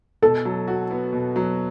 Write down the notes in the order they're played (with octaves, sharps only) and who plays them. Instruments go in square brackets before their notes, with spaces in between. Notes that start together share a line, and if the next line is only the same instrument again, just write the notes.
[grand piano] B2 [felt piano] A4
[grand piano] F#3
F#4
B3
B2
F#3